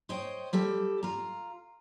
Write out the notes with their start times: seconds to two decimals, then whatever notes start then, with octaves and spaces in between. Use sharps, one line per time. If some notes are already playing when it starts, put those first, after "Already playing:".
0.09 C5 C#5 D#5 G5
0.53 G3 G4 A4
1.03 F4 A#5